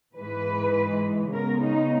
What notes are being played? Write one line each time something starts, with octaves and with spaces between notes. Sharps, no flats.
G#2 E3 G#3 B4
C#3 G#3 B3 A#4
D#4